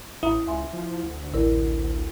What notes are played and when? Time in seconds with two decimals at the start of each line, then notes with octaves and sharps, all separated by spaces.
0.23 A1 E4 A#5 D#6
0.47 C#2 E5 G#5 C6
0.73 F3
1.03 D2
1.34 A1 E4 A#4 D5